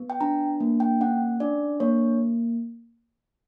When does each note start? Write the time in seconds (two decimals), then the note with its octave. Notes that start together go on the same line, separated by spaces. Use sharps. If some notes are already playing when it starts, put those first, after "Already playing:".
Already playing: B3
0.10 G5
0.21 D4 A#5
0.60 A#3
0.80 G5
1.01 C#4 F#5
1.40 D4 D5
1.80 A#3 C#5